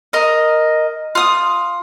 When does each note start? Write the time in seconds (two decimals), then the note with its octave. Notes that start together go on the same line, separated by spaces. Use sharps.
0.13 A#4 D#5
1.15 F4 D#6